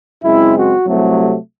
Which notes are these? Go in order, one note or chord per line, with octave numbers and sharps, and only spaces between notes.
F#2 C#3 G#3 C4 E4
F#4
C2 C3 F#3 A3